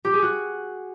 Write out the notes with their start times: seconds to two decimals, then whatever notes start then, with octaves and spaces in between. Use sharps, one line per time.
0.05 G4
0.13 G#4
0.22 F#4